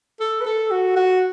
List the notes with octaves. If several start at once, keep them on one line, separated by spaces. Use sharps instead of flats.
A4
B4
A4
F#4
F#4